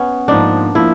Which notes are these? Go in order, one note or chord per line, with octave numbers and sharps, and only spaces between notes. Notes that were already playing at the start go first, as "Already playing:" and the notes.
Already playing: B3 C#4
G#2 F3 A#3 D4 D#4
F3 A#3 E4